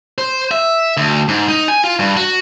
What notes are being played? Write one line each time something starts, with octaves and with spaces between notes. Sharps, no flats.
C5
E5
D2
G#2
D#4
G#5
F4
G2
F#4